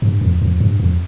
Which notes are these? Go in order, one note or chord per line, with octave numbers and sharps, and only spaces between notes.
G2
F2
F2
G2
F2